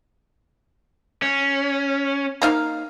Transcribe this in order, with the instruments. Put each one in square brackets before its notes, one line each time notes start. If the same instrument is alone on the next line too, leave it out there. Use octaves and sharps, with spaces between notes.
[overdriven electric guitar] C#4
[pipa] A#3 D#4 F5